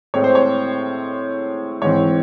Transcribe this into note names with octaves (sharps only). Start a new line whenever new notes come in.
A2 G#3 C4 C#5
C5
C#5
G#2 E3 C4 C#5